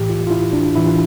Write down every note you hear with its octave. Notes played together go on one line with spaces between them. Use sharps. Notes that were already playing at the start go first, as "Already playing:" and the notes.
Already playing: A2 E3 G4
F4
F4
E4
D4
A2 E3 E4
F4